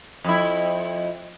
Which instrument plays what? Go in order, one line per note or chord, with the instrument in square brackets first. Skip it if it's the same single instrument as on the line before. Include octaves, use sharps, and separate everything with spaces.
[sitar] F2 E4